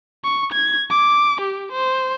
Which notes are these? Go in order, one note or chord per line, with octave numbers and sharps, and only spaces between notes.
C#6
G#6
D6
G4
C5